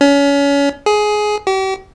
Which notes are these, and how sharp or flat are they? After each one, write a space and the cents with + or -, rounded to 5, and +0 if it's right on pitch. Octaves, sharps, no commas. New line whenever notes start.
C#4 +30
G#4 +15
G4 -40